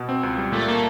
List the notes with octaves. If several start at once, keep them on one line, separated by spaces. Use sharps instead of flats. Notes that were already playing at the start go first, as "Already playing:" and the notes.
Already playing: B2
C4
C#2
G3
A#2 A3
A#3